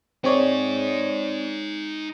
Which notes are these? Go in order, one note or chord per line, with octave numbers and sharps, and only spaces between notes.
C4 D#4 G#4 C#5 D5